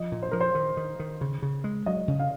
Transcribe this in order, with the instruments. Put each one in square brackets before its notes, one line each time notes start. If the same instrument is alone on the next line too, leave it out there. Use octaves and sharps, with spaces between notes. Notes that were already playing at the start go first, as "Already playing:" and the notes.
Already playing: [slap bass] F3 [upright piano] D#5
[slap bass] A#2
[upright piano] C5
[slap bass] F3 [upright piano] A#4
[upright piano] C5
[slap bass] D#3
D#3
D#3
C#3
C#3
G#3
[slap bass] F#3 [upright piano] D#5
[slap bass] C#3
[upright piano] F5